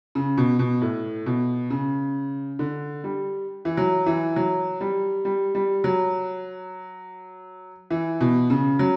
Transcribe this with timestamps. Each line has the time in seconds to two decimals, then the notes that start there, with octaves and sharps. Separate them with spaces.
0.15 C#3
0.38 B2
0.59 B2
0.82 A2
1.26 B2
1.70 C#3
2.59 D3
3.04 G3
3.65 E3
3.77 F#3
4.06 E3
4.36 F#3
4.81 G3
5.25 G3
5.55 G3
5.84 F#3
7.90 E3
8.21 B2
8.50 C#3
8.79 F#3